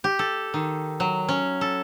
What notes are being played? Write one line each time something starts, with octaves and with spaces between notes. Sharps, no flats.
G4
A4
D#3
F#3
C#4
A4